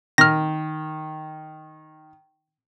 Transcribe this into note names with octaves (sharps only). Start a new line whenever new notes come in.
D#3 F6 A#6